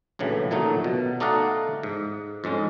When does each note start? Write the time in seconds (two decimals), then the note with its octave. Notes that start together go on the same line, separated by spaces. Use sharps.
0.19 A#1 A2 C#3 E3 F#3
0.51 F2 A#2 D#3 F#3 A3 D#4
0.84 B2
1.20 A3 D#4 D5 D#5 F5 F#5
1.83 G#2
2.44 F2 G#2 G#3 C#4